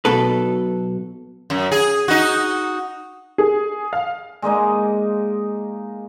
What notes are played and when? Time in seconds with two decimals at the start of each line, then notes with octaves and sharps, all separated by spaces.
0.05 B1 B2 A4 B4
1.50 F#2
1.72 G#4
2.08 D#4 F#4
3.38 G#4
3.93 F5
4.42 G#3 A#3 D#4 D#5